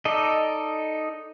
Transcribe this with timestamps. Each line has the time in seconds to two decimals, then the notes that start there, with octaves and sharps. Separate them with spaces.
0.05 D#4 A4 D5 D#5